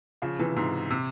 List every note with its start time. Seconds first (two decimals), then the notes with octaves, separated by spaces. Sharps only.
0.22 C#3 F3
0.39 C3 E3
0.56 G#2 C3
0.90 C3